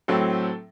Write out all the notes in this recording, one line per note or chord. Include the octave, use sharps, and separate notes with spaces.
A2 F#3 C4 A4